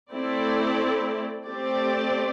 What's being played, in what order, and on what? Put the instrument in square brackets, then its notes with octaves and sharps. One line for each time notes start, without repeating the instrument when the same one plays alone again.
[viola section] A3 C4 E4 A4 D5
A3 C4 G4 D5